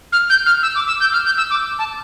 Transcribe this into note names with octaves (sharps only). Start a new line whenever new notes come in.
F6
G6
F6
E6
D6
E6
G6
F6
G6
E6
D6
A5